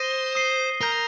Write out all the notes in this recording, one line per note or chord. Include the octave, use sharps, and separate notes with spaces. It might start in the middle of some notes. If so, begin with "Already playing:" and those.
Already playing: C5 D#6 A#6 D#7 G7
D#6 C7 D#7 G7
A#4 A#5 G6 A#6 G7